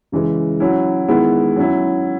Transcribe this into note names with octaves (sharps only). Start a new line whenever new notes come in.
C#3 E3 G#3
F#3 C#4 E4
D#3 G#3 B3 E4
F#3 C#4 E4